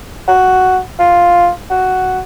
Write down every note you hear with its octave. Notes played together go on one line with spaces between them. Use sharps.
F#4
F4
F#4